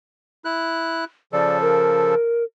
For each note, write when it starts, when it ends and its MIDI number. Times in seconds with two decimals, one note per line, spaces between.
0.45 1.05 64
0.45 1.05 90
1.33 2.15 49
1.33 2.15 53
1.33 2.15 69
1.33 1.57 74
1.62 2.44 70